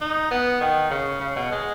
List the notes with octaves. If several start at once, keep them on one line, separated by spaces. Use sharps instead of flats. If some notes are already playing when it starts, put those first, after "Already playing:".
D#4
B3
D#3
C#3
C#3
B2
G#3